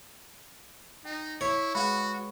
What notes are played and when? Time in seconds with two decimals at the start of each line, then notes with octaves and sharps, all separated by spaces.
1.05 D#4 G5
1.41 E4 C#5
1.75 G#3 F#4 B4 F5 F#5 B5